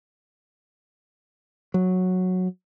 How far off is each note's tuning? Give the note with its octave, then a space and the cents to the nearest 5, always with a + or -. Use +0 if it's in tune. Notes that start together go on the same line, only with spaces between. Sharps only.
F#3 -10